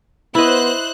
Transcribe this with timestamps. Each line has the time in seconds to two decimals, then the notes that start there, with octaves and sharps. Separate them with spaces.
0.35 B3 E4 C5 D#5 F#6